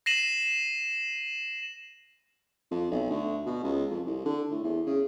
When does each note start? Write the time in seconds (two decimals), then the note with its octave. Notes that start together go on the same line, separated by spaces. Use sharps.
0.06 A#6 C7 D#7 E7 F#7
2.71 F2
2.91 B1
3.10 D2
3.46 B2
3.63 C#2
3.91 F2
4.06 C2
4.25 D3
4.51 A2
4.64 E2
4.86 C#3